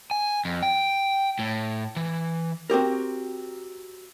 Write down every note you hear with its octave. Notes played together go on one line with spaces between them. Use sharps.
G#5
F2
G5
A2
E3
C4 F#4 G4 A#4